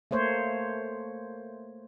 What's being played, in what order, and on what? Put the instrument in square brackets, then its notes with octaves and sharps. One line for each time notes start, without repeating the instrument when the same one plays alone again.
[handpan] A3 A#3 C5 C#5